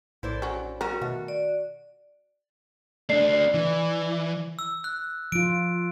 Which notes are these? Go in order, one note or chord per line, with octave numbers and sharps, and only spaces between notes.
A#1 A2 E4 C5 D5
F#3 C#4
G3 C#4 F#4 A#4
B2 D#3 A3 F#4
D5
A3 D4 D5 C7
D5
E3
E6
F#6
F3 F4 D7